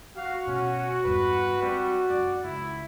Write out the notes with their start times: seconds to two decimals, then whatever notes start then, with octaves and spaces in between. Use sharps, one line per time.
0.16 F#4 F5
0.47 B2 C#4
1.05 E2 G2 B4
1.62 G3 C4
2.10 F#2 D5
2.44 C#2 E4